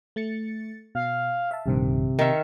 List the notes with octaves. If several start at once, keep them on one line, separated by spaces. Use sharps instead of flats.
A3 A6 C#7
B2 F5
E5 F5 A5
A#1 G2 C3 D#3
D#3 E5 F6 C#7